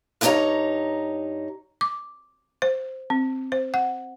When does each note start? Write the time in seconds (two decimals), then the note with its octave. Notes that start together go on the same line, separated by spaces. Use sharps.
0.21 G2 A#3 D#4 G4 C#5 A#5
1.81 D6
2.62 C5
3.10 C4
3.52 C5
3.74 F#5